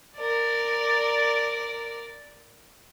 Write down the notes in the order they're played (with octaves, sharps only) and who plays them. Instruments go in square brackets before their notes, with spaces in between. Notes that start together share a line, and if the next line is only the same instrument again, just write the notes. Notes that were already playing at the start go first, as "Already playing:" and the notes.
[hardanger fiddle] A#4 D5